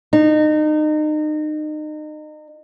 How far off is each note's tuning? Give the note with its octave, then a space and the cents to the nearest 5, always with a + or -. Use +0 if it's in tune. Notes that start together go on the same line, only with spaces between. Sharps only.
D#4 -30